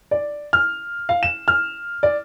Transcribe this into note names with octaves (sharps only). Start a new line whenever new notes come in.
D5
F6
F5
E7
F6
D5